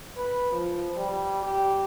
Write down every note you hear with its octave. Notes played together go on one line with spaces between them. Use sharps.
B4
F3
G3
G4